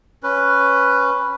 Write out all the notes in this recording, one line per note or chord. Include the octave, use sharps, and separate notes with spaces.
C#4 B4